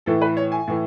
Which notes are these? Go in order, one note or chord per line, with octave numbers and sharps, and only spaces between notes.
A2 E3 A4
B4
C#5
G#5
A2 E3